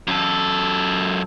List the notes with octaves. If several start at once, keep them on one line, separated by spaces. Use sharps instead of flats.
F#2 A4